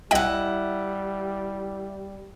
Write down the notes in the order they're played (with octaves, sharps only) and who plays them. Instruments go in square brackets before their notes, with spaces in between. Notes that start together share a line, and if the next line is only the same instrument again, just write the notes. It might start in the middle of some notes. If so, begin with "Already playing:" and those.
[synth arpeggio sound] C2 D#5 G5 [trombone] G3 [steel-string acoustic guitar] E4 F#5